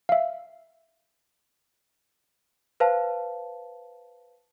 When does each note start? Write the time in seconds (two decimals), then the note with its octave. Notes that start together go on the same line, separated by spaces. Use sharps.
0.09 E5 F5
2.80 B4 C5 F5 A5